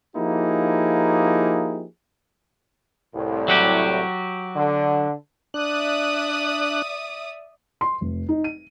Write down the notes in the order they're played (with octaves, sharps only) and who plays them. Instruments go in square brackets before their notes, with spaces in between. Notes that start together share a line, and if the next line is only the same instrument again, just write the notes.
[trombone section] F3 A#3 D#4 E4 G4 G#4
C2 A2
[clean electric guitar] F#3 F#4 G4
[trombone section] D3
[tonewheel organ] D4 F#6 [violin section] D5 E5 D#6
[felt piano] C6
F1
D#4
D#7